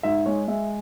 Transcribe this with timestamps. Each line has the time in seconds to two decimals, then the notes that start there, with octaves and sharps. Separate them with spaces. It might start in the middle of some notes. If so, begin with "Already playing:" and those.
0.03 G#2 E5
0.26 G#3 C#5
0.48 G#3 E5